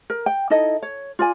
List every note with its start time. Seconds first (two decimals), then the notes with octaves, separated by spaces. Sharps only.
0.10 A#4
0.26 G5
0.50 D#4 E4 A4 D#5
0.82 C#5
1.19 F4 D5 G#5